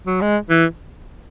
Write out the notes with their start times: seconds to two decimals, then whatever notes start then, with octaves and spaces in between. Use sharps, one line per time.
0.07 F#3
0.22 G#3
0.50 E3